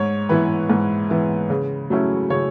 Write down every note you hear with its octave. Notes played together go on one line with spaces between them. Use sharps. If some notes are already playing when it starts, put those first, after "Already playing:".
Already playing: G#2 C#5
E3 B3 E4 B4
G#2
E3 B3 E4
C#3
F#3 A3 C#4 E4
C#3 C#5